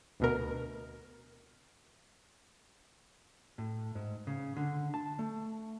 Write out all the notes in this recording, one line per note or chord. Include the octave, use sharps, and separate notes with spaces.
D2 B2 A#4
A2
G#2
C#3
D3
A5
A3